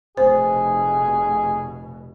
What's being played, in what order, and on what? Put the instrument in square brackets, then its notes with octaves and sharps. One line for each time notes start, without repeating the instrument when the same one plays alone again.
[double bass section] F1 B2 [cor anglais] G#4 [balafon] C5